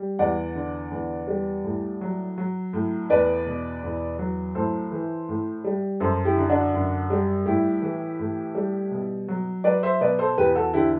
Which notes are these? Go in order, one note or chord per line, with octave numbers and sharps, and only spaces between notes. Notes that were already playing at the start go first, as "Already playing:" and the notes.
Already playing: G3
E2 D5 F#5
D3
E2
G3
A2
F#3
F#3
A2
E2 B4 D5
B2
E2
F#3
A2 A4 C5
E3
A2
G3
F#2 A4 C5
E4 G4
D3
D4 F#4
F#2
G3
A2 E4 G4
E3
A2
G3
B2
F#3
F#3 B4 D5
C5 E5
B2 B4 D5
A4 C5
E2 G4 B4
F#4 A4
D3 E4 G4